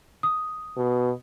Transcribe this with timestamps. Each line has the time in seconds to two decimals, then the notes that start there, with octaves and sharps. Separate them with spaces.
0.23 D#6
0.77 B2